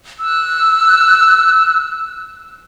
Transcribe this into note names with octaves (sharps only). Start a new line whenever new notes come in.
E6 F#6